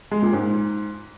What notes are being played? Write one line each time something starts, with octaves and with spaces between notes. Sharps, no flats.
G#3
A#2
G#2